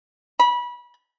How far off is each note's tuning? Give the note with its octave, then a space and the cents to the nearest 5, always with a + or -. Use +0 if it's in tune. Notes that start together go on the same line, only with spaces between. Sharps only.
B5 -25